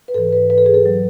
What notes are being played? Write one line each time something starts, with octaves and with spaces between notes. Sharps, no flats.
B4
G#2 E3 A4
B4
B4
A4
G#4
A4
F#3